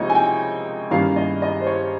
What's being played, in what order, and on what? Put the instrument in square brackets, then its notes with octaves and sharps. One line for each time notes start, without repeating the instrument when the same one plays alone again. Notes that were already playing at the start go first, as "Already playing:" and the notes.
Already playing: [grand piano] C#2 C3 F3 A#3 D#4 C#5 D#5
G#5
G5
G2 D#3 A#3 C#4 F5
D#5
D#5
C5
C#5